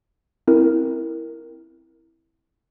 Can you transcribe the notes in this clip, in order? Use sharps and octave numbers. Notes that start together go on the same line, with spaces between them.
C4 E4 A#4